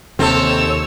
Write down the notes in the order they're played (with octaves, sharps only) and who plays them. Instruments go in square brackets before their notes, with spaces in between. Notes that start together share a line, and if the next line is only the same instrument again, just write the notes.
[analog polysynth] D#2 [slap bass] C3 [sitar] C4 A4 [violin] C#5 E6